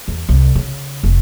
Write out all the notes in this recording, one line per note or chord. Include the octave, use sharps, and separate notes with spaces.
E2
C2
C#3
F1